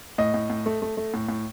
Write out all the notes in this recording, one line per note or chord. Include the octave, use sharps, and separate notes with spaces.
A2 D#5
A2
A2
A3
A3
A3
A2
A2